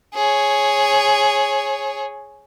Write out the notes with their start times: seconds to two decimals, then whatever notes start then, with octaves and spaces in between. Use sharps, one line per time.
0.14 G#4 C#5